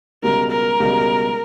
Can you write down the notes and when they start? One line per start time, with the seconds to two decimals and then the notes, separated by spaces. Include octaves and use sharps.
0.23 C#2 B2 G3 A#4
0.51 A#4
0.80 C#2 B2 G3